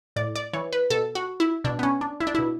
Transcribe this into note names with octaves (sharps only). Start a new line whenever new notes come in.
A2 D5
D5
E3 C#5
B4
B2 A4
F#4
E4
B2 D4
B3
C#4
D4
E4
D4
B2 E4